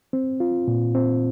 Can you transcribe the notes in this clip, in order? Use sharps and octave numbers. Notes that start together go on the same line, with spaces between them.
C4
F4
A#2
C4